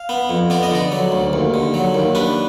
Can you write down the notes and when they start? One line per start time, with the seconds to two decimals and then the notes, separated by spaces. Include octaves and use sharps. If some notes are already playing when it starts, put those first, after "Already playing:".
Already playing: F5
0.09 B3
0.29 F2
0.50 B3 D5
0.63 D#5
0.71 D3 D5
0.92 F#3
1.12 D2
1.33 D#2
1.54 D3
1.74 F#3
1.94 D#2
2.15 D4 B4